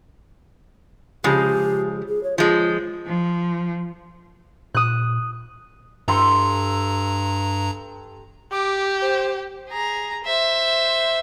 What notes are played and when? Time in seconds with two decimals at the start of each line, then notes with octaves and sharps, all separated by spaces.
1.24 C#3 F3 G#3 G4
2.08 G#4
2.23 C#5
2.38 F3 G#3 F4
3.07 F3
4.75 A#2 D#6 F#6
6.08 G2 G4 A4 A#5 C6
8.52 G4 D6
9.02 C5
9.69 G#4 A#5
10.25 C5 E5